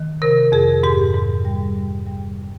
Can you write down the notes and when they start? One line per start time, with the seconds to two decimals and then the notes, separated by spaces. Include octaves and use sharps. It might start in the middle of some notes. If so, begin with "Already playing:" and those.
Already playing: D#3
0.22 C3 A#4
0.52 F2 G#4
0.83 G#2 G4
1.14 G#2
1.45 G3
1.76 G3
2.07 G3